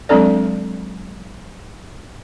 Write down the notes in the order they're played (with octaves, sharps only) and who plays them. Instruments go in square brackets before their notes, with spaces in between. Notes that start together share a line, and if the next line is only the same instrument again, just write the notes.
[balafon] F#3 G#3 C4 D4 A4 D5